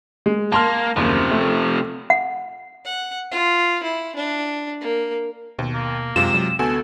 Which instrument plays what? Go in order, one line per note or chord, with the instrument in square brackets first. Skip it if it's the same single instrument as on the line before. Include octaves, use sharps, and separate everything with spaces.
[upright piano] G#3
[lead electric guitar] A#3 [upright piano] A5 C6 F6
[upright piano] F#1 D#2 [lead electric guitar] C3 F3
[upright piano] A3
[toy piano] F#5
[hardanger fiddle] F#5
F4
E4
D4
A#3
[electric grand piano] D#2 [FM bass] B2
[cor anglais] A#3
[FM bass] F#2 [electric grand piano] C3 G#3 F4 [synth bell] E7
[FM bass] F#3
[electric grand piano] D2 F#4 G#5 [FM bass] B3 [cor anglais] A4